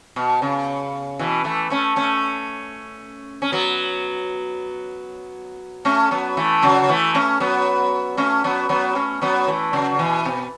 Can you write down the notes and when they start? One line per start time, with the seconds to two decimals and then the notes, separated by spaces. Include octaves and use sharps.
0.16 B2
0.42 C#3
1.19 B2 E3
1.44 E3 A3
1.70 A3 C#4
1.96 A3 C#4
3.42 C#4
3.52 F#3 B3
5.85 A3 C#4
6.11 F#3 B3
6.37 E3 A3
6.63 C#3 F#3
6.89 E3 A3
7.14 A3 C#4
7.40 F#3 B3
8.17 A3 C#4
8.44 F#3 B3
8.69 F#3 B3
8.95 A3 C#4
9.22 F#3 B3
9.47 E3 A3
9.73 C#3 F#3
9.99 B2 E3
10.25 B2